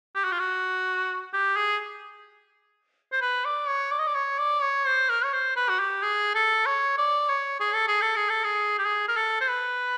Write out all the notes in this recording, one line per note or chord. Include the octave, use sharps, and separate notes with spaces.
G4
F#4
F4
F#4
G4
G#4
C5
B4
D5
C#5
D5
D#5
D5
C#5
D5
C#5
C5
A#4
C#5
C5
B4
F#4
G4
G#4
A4
C#5
D5
C#5
G#4
A4
G#4
A4
G#4
A4
G#4
G4
G#4
A#4
A4
C5
B4